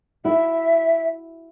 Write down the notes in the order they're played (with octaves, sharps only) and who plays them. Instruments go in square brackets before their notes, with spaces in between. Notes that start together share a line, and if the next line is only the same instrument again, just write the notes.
[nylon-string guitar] E4 F#4 [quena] E5